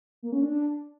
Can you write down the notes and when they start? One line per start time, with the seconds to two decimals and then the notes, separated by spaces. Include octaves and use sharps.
0.23 A#3
0.32 C#4
0.42 D4